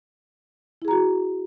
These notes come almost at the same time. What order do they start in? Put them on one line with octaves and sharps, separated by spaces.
E4 G#4 A#5 F#4